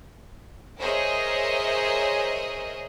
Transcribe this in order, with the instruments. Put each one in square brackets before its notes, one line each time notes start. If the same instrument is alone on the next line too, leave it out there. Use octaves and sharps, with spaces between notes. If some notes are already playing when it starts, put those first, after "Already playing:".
[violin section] G#4 A#4 C5 C#5 D#5 E5